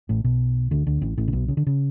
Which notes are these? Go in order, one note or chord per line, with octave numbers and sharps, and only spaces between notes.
A1 A2
B1 B2
D2 D3
D2 D3
A1 A2
A1 A2
C#3
B1 B2
C#3
D3
C#3